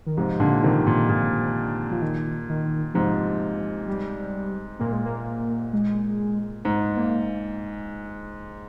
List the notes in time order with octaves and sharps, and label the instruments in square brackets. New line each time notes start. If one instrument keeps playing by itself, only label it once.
[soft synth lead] D#3
[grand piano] G#2 C3 [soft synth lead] F3
[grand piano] A#2 D3
C3 D#3
A#2
A#2
[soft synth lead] F3
D#3
D#3
[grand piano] G#2 C3 [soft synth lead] F3
[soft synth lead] G3
[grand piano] A#2 [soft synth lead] A#3
[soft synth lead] G#3
A#3
G#3
[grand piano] G#2
[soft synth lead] A#3